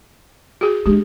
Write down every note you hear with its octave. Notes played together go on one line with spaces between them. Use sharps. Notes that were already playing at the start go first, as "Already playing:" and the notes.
F#4 G#4
G#3 D4 G4